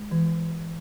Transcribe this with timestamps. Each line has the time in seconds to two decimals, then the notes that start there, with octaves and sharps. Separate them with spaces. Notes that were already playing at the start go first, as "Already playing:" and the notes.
Already playing: G#3
0.11 E3